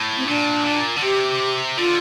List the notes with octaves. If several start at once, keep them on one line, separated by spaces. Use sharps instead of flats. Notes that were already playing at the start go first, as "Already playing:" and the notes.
Already playing: A2
C4
A#2 D4
A#2
D3
C3 G4
D3 F4